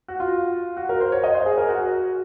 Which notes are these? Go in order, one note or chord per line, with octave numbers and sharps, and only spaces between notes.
F#4
F4
F#4
A#4
C5
C#5
D#5
C5
G#4
A#4
F#4